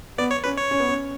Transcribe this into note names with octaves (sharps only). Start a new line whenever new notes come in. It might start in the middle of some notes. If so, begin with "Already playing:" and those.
B3 D5
C#5
C#4 B4
C#5
C#4
B3
C#4